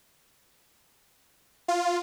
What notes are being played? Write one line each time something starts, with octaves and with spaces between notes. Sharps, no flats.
F4